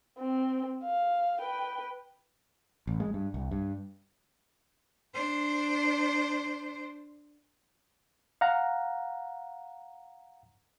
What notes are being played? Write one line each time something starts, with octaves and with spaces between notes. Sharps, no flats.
C4
F5
B4 G5
A1
G#3
G2
C2
G2
D4 C5
F5 F#5 A#5